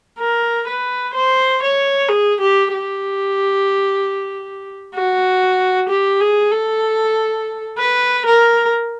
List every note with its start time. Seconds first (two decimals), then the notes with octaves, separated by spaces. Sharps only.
0.19 A#4
0.67 B4
1.14 C5
1.63 C#5
2.09 G#4
2.41 G4
2.73 G4
4.95 F#4
5.89 G4
6.21 G#4
6.52 A4
7.78 B4
8.26 A#4